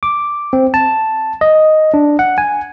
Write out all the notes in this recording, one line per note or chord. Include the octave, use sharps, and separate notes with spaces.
D6
C4
A5
D#5
D4
F#5
G#5